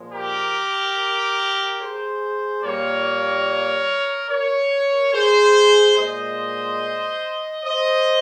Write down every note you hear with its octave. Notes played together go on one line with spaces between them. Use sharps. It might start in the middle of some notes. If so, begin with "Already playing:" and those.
Already playing: A#2 F3 G#3
G4 A#4
G#4 C5
A#2 G3 A#3 A#4 C#5
A#4 C#5
G#4 C5
A#2 G#3 C5 D#5
C5 D#5